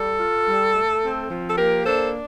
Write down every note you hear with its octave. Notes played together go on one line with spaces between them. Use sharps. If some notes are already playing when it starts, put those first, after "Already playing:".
Already playing: G3 A4
F4
G3
A3
C4
F3
A4
A#3 G4 A#4
D4 A4 C5